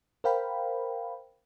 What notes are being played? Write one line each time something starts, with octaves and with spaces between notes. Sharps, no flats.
A#4 C5 F5 G5 B5